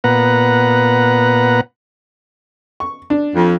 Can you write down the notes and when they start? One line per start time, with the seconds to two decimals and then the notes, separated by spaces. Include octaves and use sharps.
0.04 A#2 B3 B4 F#5 A#5
2.80 C#6
3.10 D4
3.35 F2